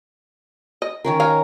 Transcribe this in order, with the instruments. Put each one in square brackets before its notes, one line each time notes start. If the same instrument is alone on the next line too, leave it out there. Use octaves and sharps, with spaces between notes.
[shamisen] D#5
[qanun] D#3 C#4 A#4
[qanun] C#5 G#5 A#5 [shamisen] F5